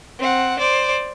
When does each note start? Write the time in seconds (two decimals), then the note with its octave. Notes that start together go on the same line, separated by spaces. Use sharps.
0.19 C4 F#5
0.59 C5 D5